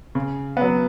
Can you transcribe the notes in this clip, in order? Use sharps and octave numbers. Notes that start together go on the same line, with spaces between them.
C#3
F#3 B3